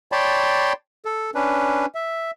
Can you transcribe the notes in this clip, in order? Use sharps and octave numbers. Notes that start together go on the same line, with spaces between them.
C#5 D5 G5 A5 B5 C6
A4
C#4 D4 B4
E5